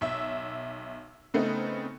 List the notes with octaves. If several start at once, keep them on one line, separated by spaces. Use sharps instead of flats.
B1 E5 E6
C#3 A3 B3 C4 D#4